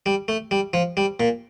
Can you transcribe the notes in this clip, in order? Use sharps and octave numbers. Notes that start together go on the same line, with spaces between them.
G3
A3
G3
F3
G3
A#2